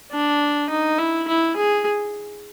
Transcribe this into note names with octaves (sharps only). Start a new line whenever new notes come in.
D4
D#4
E4
E4
G#4